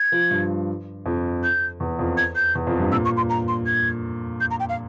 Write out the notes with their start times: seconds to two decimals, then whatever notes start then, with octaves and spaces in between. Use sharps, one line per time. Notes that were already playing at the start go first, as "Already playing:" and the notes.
Already playing: G#6
0.12 F3
0.31 G2
1.06 F2
1.43 G6
1.80 E2
1.99 F2
2.17 G#6
2.36 G6
2.55 E2
2.67 F2
2.80 G2
2.92 A#2 E6
3.05 C#6
3.17 C6
3.30 A#5
3.48 C6
3.66 G#6
4.41 G6
4.51 A#5
4.60 G5
4.69 F5